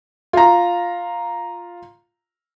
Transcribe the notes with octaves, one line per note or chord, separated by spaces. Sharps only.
F4 A#5